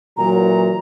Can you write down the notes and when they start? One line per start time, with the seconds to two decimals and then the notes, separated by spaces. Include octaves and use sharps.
0.17 A#2 E3 F#3 A#5